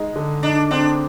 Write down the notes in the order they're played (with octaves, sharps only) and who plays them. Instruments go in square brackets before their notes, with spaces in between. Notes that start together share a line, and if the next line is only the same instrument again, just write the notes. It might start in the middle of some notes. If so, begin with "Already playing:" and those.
Already playing: [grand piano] G#3 D#4
D3
[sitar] D4 [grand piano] D#4
[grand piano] C4 [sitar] D4